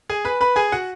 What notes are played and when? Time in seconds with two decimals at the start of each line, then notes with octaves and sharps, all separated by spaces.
0.09 G#4 G#5
0.25 B4 B5
0.41 B4 B5
0.56 G#4 G#5
0.72 F#4 F#5